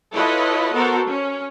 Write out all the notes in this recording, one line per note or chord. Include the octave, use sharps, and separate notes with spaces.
E4 F4 A4 B4 C#5 D#5
B3 F#4 A4 A#4 C5
C#4